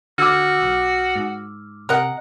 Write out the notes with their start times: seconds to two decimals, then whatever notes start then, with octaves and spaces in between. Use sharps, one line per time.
0.18 D3 F#4 D6 E6 F6
0.62 B1
1.16 G#2
1.89 C3 A#4 D#5 F#5